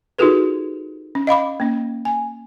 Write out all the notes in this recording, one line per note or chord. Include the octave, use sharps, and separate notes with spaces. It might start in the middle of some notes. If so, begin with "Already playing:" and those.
D#4 F4 F#4 G#4 A4 B4
C#4
D#5 F5 B5 D6
A#3 C#4
G#5